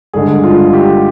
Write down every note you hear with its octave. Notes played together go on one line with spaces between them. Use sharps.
G2 D3 G#3 G#4
F4
G4